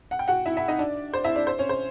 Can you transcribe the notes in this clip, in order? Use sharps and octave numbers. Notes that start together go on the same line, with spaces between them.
F#5
G5
F#4 F#5
E4 E5
E4 E5
D#4 D#5
D4 D5
C5
E4 E5
D4 D5
C5
C#4 C#5
C5